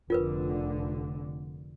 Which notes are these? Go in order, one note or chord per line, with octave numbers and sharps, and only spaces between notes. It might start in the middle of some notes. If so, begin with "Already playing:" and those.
F1 D3 F4 A#4 B4